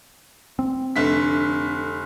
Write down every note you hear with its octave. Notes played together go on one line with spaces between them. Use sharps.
C4
F1 D3 B6